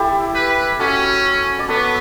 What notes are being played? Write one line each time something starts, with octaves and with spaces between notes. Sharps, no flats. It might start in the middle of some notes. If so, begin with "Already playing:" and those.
Already playing: E4 G4 A4
B4
C#4 F#4 A4
D5
B3 A4 C#5